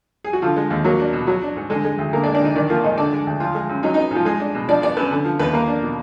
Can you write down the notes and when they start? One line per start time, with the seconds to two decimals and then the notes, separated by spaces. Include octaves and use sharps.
0.24 G#4
0.33 F#4
0.42 D3 F3 F4
0.56 G#3
0.70 D#2
0.84 F#3 A#3 F#4
1.00 D4
1.13 B2
1.27 F#3 F#4
1.42 D4
1.56 G#2
1.70 D3 G#3 G#4
1.85 G#3
1.98 D2
2.13 D3 A#3 A#4
2.23 D4 D5
2.27 G#3
2.34 D4 D5
2.41 D2 D#4 D#5
2.55 D#3 D4 D5
2.69 F3 A#3 F4
2.84 G#2 D#4 D#5
2.97 D3 D4 D5
3.13 G#3
3.27 D2
3.40 F3 F4
3.55 G#3
3.69 F#2
3.83 F#3 D#4
3.94 B3 D#4
4.11 G#2 F3 F4
4.25 G#3 G#4
4.40 D4
4.55 B2
4.68 F3 D4 D5
4.82 B3 D4 D5
4.97 F#2 B3 B4
5.11 D3
5.25 F3
5.39 D#2 B3 B4
5.53 A#3 A#4
5.68 D4
5.82 B2